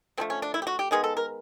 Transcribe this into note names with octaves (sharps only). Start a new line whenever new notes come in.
D3 F3 A3 C4
C#4
D4
E4
G4
F#4
G4
D#3 G#3 B3 G#4
A4
A#4